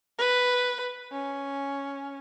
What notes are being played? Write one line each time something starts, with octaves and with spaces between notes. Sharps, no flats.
B4
C#4